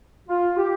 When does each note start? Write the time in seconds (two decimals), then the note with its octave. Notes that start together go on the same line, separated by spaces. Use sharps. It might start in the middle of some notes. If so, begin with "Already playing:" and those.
0.28 F4
0.56 G4